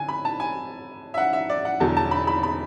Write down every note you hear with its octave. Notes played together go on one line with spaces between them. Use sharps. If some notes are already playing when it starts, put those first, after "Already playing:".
Already playing: D3 G#5
B5
A5
G#5
E5
F#5
E5
D5
F#5
E1 E2 D3 F#3 A5
A5
B5
B5
B5